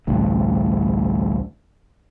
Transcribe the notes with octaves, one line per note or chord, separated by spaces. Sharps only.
A1 D2 G2